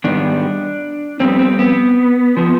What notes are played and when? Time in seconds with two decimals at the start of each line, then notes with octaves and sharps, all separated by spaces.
0.04 G#2 D#3 G3 B3 D4
1.20 F2 D3 G3 B3 C4
1.39 C4
1.59 B3
2.37 F3 B3